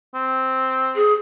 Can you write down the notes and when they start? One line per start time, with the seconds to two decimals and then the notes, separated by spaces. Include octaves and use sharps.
0.15 C4
0.95 G#4